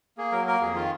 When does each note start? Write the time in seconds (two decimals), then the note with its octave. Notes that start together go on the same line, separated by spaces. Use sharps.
0.18 A#3 G#4
0.32 F#3 A#4
0.47 A#3 A#4
0.62 F2 G#4
0.75 D#3 F4